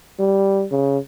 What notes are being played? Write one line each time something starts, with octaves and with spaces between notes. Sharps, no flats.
G3
C#3